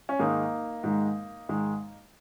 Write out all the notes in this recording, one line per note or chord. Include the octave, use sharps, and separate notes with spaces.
C#4
G#2 D#3 G#3 A#3 D#4
G#2 D#3 G#3
G#2 D#3 G#3